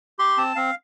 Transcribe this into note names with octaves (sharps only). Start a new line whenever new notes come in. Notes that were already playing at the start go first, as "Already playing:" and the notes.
G4 C6
C4 A5
C4 F5